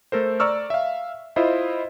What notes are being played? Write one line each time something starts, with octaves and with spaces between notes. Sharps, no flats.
A3 A4 A#4 C5
D5 A#5 C#6 E6 F6
E5 F5
E4 F4 C5 D#5 E5